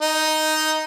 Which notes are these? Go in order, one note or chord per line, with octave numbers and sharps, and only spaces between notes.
D#4